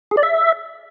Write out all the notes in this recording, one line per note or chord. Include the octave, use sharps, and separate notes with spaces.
G#4
D5
E5